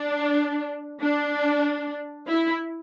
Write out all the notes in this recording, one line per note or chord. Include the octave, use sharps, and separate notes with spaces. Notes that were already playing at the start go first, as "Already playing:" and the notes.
Already playing: D4
D4
E4